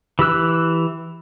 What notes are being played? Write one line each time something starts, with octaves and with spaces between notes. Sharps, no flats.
E3 G4 E6 F#6